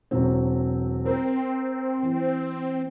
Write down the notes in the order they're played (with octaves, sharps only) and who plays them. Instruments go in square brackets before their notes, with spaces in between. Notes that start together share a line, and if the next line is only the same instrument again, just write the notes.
[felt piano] E1 F#3 C4
[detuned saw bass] C4 [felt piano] A#4
[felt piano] E3